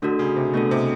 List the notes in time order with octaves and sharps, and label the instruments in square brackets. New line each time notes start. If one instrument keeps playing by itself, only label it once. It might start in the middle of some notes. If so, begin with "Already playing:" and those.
[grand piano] D3 [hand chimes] A3 D4 F#4 A4
[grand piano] C#3
C3
[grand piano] B2 [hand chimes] A3 D4 F#4 A4
[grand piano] C3